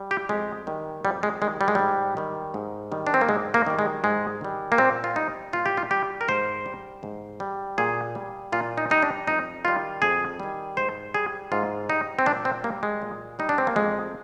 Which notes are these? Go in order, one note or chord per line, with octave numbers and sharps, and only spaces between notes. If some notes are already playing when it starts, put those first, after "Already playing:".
Already playing: G3
G4
F2 G#3
D#3 G3
F2 G3
G#3
D#3 G3 G#3
G3
G#3
G#2 G3
D#3 G3
G#2
D#3 G3
D4
C4
A#3
G#2 G#3
A#3
D#3 G3
G#3
G#2 G#3
D#3 G3
A#3
A#2 C4
F4
G3 D#4
A#2 F4
G4
F4
G3 G4
A#4
G#2 C5
G3
G#2
G3
A#2 G#4
G3
A#2 F4
D#4
G3 D#4
D4
F2 D#4
D#3 G3 F4
F2 G#4
D#3 G3
G#2 C5
G3 G#4
G#2 F4
G3 D#4
C4
A#2 D4
C4
G3 A#3
G#3
A#2
G3 D#4
D4
C4
A#3
F2 G#3